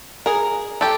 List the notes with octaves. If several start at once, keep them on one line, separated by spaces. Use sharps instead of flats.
G#4 A#4
G4 A4